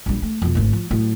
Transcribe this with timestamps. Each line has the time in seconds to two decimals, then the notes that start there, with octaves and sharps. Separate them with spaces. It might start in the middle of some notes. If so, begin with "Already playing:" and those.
0.06 A#1 G3
0.22 A3
0.42 F2 B2
0.55 G#1 D2
0.73 F3
0.91 A2 F#3